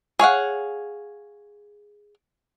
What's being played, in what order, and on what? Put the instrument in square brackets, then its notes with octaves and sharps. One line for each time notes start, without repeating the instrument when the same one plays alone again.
[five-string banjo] G#4 C#5 F5 F#5